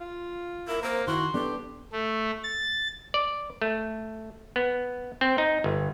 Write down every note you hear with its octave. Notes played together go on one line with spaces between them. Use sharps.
F4
E4 A#4
A#3 A#4 C5
D#3 E4 F#4 C6
B3 D4 G4 A4
A3
A6
D5
A3
B3
C4
D#4
G1